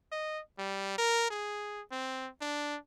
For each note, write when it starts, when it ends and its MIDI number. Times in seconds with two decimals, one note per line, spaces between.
0.12 0.41 75
0.58 0.94 55
0.98 1.30 70
1.30 1.81 68
1.92 2.29 60
2.41 2.77 62